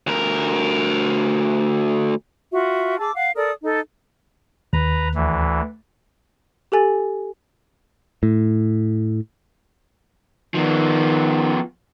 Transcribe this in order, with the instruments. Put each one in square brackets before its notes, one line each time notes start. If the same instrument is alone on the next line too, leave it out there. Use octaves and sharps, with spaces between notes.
[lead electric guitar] D2 A#4
[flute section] F4 F#4 E5
G#4 A5 D6 E6
F5 F#5
A4 A#4 D5 D#6
D#4 A4
[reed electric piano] D#2 [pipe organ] B4 A#5
[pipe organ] D2 E3
[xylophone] G4 A4 G#5 A6
[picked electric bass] A2
[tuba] D#3 [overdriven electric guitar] F3 B3